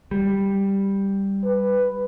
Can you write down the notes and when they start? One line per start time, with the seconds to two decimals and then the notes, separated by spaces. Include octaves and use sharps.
0.11 G3
1.44 B4